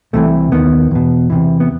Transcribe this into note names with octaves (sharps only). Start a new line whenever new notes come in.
C2 C3 E3 A3
D#2 D#3 B3
E2 B2
E2 C3 E3
B3